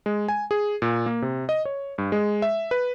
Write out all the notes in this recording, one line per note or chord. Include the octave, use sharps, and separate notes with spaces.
G#3
G#5
G#4
A#2
A#3
C3
D#5
C#5
G2
G#3
E5
B4